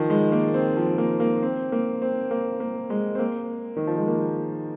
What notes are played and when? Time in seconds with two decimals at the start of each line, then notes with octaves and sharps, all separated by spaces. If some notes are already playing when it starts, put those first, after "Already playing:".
Already playing: D#3 F3
0.10 G#3
0.32 A#3
0.54 C4
0.77 F3
0.98 A#3
1.20 A#3
1.42 C4
1.72 A#3
2.02 C4
2.31 A#3
2.60 A#3
2.90 G#3
3.15 C4
3.19 A#3
3.76 D#3
3.87 F3
3.97 G#3
4.08 A#3